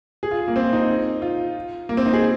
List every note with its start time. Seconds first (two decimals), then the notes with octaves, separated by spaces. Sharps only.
0.23 G#4
0.31 F4
0.48 A#3
0.56 C4
0.73 D#4
1.22 F4
1.89 A#3
1.97 C4
2.06 D#4
2.13 G#4